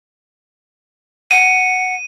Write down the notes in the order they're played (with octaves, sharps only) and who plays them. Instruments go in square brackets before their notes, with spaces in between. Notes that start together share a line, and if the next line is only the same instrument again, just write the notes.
[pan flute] F#5 [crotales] D#7